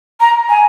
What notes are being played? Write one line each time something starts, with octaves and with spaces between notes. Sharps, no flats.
A#5
G#5